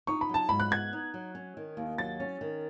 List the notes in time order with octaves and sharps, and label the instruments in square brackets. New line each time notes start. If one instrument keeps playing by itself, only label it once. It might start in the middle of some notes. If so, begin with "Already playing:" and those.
[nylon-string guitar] D#4 [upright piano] C#6
[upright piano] B5
[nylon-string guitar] F#3 [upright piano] A5
[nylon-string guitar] G#2 [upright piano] B5
[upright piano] F#6
[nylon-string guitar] B3 [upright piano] G#6
[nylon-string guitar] D#4
F#3
C#4
D#3
D#2
[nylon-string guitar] F#3 [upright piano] A6
[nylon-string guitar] C#4
D#3